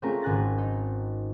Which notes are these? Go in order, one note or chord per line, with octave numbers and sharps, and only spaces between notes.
G#3 A3 C4 C#4 F4 A#4
G#1 G#5 F#6 A6 A#6
D#4